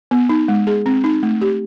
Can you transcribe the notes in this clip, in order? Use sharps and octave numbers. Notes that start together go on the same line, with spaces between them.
B3
D#4
G#3
G#4
C4
D#4
A3
G4